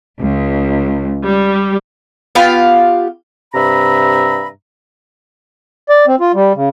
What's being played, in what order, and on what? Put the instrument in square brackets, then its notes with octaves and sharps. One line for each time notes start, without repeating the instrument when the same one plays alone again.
[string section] C#2
G3
[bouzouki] B3 F4 G4 F5
[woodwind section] G2 C3 E5 A#5 B5
[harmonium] D5
C4
F4
G3
C#3